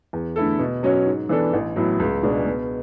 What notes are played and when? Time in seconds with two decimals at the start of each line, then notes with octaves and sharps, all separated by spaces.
0.13 E2
0.36 D3 A3 E4 A4
0.59 B2
0.83 F#3 C#4 F#4 C#5
1.06 G#2
1.29 E3 B3 D4 A4
1.53 A1
1.76 A2 F#3 B3
2.00 C#2
2.23 B2 G#3 D4 G#4
2.46 B2